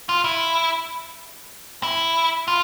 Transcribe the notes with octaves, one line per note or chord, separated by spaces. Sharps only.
F4
E4
E4
F4